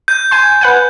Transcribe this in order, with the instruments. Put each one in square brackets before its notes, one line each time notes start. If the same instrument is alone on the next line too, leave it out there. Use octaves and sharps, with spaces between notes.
[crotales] G6
[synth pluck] G#5 C6
B4 F#5 G#5